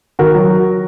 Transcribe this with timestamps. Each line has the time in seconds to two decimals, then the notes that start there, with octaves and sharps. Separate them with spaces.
0.19 D#3 F#4 A#4
0.35 F#3